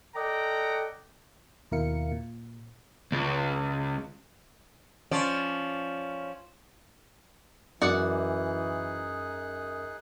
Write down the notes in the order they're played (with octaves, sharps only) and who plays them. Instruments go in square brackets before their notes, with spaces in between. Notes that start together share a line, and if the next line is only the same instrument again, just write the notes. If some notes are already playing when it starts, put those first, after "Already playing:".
[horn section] A4 D5 D#5 F#5 G5 A#5
[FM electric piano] D#2 B2 E4 A#4 F5 C#7
A#2
[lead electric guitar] C#2
[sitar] F3 C#4 D5
[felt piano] F#2 [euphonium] E3 [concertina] D#4 G#4 F#6 [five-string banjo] F#4 D5 F#5